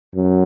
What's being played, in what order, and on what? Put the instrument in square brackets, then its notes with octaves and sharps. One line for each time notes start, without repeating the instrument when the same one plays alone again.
[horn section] F#2